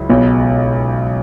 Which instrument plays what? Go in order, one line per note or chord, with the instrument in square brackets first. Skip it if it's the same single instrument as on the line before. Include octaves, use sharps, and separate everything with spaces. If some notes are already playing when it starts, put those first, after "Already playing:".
Already playing: [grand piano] C#2 F#3 E4
[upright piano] B1 B2